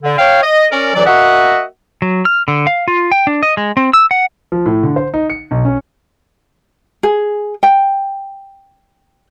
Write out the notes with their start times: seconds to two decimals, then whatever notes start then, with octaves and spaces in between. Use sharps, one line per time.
0.03 D3
0.18 C#5 F5 G5
0.43 D#5
0.72 C#4 A#4 D5
0.95 D2 E3 F#3 D5
1.06 A#3 F#4 D#5 E5 F#5
2.02 F#3
2.25 F6
2.48 D3
2.67 F5
2.88 F4
3.12 G5
3.27 D4
3.43 D#5
3.57 G#3
3.77 C4
3.93 E6
4.11 F#5
4.52 F3
4.66 A2
4.83 D3
4.96 C5
5.14 D#4
5.30 C#7
5.51 B1
5.65 C#4
7.03 G#4
7.63 G5